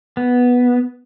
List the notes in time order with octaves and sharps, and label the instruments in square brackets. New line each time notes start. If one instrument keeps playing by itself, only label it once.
[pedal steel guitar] B3